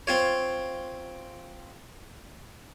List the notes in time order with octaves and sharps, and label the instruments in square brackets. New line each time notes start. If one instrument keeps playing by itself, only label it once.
[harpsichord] C4 F4 C#5